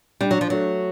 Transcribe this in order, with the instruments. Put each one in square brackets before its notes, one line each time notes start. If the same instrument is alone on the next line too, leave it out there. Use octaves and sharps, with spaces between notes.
[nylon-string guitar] G3 [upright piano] D4
[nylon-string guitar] F#3
F3
[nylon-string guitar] F#3 [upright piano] A3